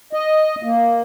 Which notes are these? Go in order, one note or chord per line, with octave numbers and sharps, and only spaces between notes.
D#5
A#3